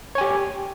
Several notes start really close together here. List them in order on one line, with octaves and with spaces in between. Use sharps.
C#5 G#5 G4